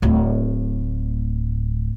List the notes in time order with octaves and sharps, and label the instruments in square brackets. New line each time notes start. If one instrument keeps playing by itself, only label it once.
[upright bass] D1 A2